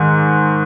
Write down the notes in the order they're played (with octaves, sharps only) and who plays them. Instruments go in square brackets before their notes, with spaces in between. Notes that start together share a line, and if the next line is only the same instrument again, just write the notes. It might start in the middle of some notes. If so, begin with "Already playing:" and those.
Already playing: [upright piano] G#2 D#3